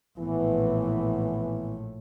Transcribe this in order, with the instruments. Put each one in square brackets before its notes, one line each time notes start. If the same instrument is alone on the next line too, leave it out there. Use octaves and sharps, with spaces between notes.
[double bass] A#1 A2 [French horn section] E3 B3